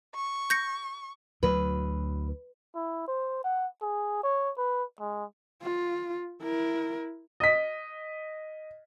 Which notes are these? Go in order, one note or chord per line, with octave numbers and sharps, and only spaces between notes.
C#6
G6 A#6 C#7
D2 F#3 B4
E4
C5
F#5
G#4
C#5
B4
G#3
F4
E4 A#4
D#5 B6